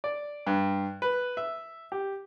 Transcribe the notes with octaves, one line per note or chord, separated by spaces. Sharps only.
D5
G2
B4
E5
G4